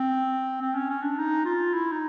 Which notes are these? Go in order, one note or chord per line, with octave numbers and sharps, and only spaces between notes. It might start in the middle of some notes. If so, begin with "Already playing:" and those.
Already playing: C4
C4
C#4
C#4
D4
D#4
F4
E4
D#4